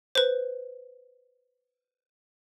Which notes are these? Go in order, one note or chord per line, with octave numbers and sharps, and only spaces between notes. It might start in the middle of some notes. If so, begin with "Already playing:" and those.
B4 C5